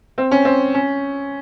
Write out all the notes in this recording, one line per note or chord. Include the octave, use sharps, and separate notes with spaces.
C4
C#4
C4
C#4